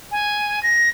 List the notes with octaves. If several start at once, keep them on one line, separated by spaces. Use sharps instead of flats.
G#5
A#6